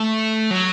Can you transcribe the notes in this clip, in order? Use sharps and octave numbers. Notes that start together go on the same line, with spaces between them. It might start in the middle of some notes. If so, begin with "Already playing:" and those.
Already playing: A3
F#3